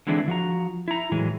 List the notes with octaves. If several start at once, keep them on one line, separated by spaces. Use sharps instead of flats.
D3 E3 G#3 C4 D4 E4
F3 F#4 A#5
E4 A#5
A2 E3 F#3 G#3